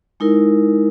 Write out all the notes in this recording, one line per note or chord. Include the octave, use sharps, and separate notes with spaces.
G#3 D#4 E4 A#4